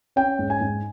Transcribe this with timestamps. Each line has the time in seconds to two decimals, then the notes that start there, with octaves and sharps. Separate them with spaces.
0.16 C#4 G5
0.39 G#2
0.50 G#5
0.61 G#2